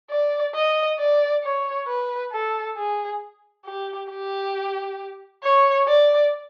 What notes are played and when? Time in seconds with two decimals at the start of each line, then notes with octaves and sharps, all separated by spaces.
0.10 D5
0.55 D#5
0.99 D5
1.44 C#5
1.88 B4
2.32 A4
2.77 G#4
3.65 G4
4.10 G4
5.43 C#5
5.88 D5